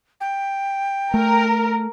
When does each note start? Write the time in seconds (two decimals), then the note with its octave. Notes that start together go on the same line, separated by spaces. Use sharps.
0.21 G5
1.14 A3 A#4